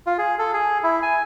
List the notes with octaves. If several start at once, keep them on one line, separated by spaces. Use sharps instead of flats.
F4
G#4
A4
G#4
E4
G#5